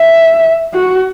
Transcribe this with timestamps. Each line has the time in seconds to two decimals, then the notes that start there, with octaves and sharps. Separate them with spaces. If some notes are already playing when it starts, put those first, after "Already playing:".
Already playing: E5
0.73 F#4